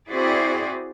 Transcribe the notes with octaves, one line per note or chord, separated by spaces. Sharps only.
C4 E4 F#4 G#4 C5 D5